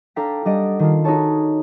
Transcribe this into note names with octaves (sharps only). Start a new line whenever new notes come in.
D4 A4 F5 G5 A#5 B6
G3 D4 D#5 F#5 D7
D#3 D4 F4
D#4 F#4 G#4 A4 C#5 A5